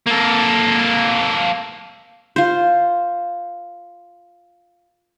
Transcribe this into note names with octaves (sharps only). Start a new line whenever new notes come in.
A#3 A4
F4 C5